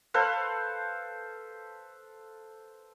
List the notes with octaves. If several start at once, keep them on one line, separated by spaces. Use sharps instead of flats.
A4 B4 C5 F5